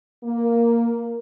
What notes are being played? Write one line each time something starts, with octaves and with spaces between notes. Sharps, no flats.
A#3